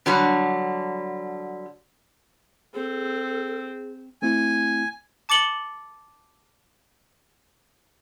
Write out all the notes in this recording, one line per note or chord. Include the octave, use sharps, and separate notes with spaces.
D3 F#3 G3
C4 G#4 A4
A3 C4 E4 G#5
A5 D6 A6 C#7 F#7 G7